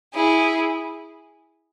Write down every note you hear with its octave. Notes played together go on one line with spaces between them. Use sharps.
E4 G#4